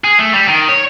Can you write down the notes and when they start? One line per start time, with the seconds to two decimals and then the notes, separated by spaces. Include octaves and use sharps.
0.04 G#4
0.19 A3
0.33 G3
0.48 D#3
0.69 C#5